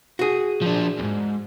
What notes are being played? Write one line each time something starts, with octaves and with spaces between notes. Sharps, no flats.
F#4 G#4
F3 D4
E2 G#2